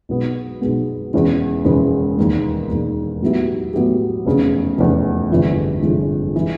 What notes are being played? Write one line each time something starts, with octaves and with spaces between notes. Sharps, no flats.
B1 B2 G#3 B3
B1 B2 G#3 B3
E1 E2 C#3 E3 G#3
E1 E2 C#3 E3 G#3
E1 D#2 D#3 G#3
E1 D#2 D#3 G#3
A2 F#3 B3 E4 G4
A2 F#3 B3 E4 G4
F1 E2 C#3
F1 E2 C#3
G1 F2 C3 E3 G#3
G1 F2 C3 E3 G#3
E3 G#3